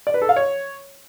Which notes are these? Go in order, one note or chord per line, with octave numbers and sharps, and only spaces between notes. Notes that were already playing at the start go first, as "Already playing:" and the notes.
D5
B4
A4
F5
C#5